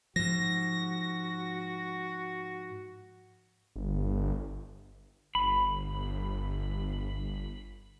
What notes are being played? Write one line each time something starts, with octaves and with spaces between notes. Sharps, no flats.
G#2 F3 F#4 A#6
G1
G1 B5